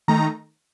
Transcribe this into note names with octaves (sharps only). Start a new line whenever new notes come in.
D#3 A3 D#4 A#5